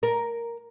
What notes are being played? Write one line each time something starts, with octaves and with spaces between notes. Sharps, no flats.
A#4